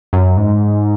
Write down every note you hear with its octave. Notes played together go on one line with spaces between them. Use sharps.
F#2
G#2